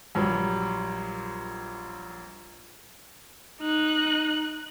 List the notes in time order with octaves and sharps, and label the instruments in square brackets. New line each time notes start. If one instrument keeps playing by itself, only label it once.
[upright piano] A#1 F#3 G3
[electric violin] D#4 F#6